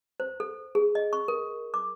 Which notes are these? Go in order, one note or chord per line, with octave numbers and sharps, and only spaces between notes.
C5
A4
G#4
D#5
C#6
A#4
D6